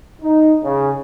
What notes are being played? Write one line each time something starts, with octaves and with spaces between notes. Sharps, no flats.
D#4
C#3